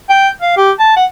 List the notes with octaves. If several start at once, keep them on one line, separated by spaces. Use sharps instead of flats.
G5
F5
G4
A5
F#5